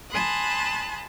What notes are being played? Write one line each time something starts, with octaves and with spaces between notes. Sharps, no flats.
G#5 A5 B5 C6 D#6 F#6